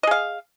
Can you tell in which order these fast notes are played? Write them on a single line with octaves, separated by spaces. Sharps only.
D#5 G#4 F5